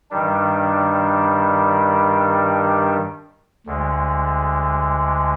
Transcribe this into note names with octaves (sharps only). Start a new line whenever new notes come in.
G2 D#3 G3 D4
D2 D3 G#3